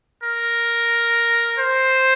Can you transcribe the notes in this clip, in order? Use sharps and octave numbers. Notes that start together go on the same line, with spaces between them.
A#4
C5